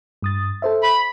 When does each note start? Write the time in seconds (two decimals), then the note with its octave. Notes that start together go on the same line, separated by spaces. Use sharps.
0.22 G2 D#6 A6
0.62 A4 C5 E5
0.83 B5